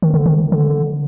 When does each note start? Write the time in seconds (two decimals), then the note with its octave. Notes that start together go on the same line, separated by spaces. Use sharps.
0.02 D#3
0.14 D3
0.26 D#3
0.52 D3